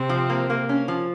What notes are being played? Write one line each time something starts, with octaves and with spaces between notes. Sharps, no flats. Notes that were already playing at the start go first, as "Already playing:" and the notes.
Already playing: C3 C4
F3
A#3
A#3
C#4
F3